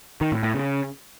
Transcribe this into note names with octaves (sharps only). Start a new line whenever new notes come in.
D#3
A2
A2
C#3